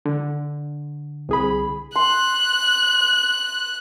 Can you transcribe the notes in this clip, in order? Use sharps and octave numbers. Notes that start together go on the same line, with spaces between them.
D3
C2 G#4 B5
C6 F#6